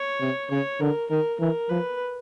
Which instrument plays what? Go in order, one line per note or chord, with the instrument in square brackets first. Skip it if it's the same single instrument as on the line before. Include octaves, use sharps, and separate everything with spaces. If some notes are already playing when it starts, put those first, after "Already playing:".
Already playing: [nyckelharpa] C#5
[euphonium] C3
[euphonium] C#3 [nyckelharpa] C#5
[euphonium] D3 [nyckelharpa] A#4
[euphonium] D#3 [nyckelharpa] A#4
[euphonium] E3 [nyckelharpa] A#4
[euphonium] F3 [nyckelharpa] B4